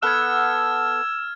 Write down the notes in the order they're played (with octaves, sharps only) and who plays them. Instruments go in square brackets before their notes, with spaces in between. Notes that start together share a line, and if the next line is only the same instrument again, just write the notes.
[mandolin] B3 A4 F#5 [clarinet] E6 [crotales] F6 G#6